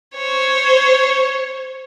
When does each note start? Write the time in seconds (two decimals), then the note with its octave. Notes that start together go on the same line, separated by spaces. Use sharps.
0.15 C5 C#5